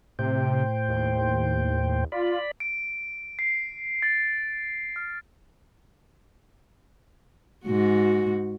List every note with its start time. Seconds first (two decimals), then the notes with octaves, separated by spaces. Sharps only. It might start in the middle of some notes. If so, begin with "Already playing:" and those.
0.19 A2 C3 C5 G5
0.89 D#2
2.12 F4 D5 B5
2.60 D7
3.39 C7
4.02 A6
4.96 F6
7.65 G#2 F#4